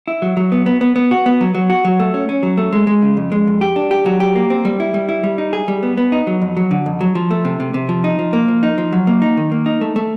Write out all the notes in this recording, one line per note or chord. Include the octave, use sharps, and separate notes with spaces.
E4
F#3
F#3
B3
B3
B3
B3
F#4
B3
F#3
F#3
F#4
F#3
A3
C#4
C#4
F#3
A3
G#3
G#3
C#3
F2
G#3
F2
G4
D4
G4
F#3
G4
A#3
C4
G3
E4
G3
E4
G3
D#4
G#4
G3
B3
B3
D#4
F#3
F2
F#3
D3
F2
F#3
F3
A3
C3
C3
C3
F3
D#4
F3
A#3
F3
D#4
F3
F#3
A#3
D#4
D#3
A#3
D#4
A3
A3